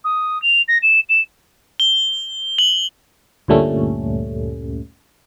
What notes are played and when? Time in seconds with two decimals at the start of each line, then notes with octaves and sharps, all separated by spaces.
0.04 D#6
0.42 F7
0.68 A#6
0.82 E7
1.09 E7
1.80 G7
2.58 F#7
3.48 D2 G2 A#2 G3 A3 C#4